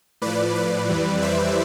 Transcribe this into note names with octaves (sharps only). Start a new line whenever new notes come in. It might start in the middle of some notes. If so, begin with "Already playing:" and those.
A2 F3 B4 D5
B4 D5
F2 E3 G3
C5 E5